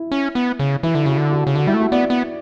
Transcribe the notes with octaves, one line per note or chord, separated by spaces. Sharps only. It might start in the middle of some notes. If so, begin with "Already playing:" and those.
Already playing: E4
C#4
B3
C#3
E3 E4
D3
E4
C#3 F#4
D3
F#4
C#3
D3 F#4
G3 E4
A3
F#4
B3 D5
B3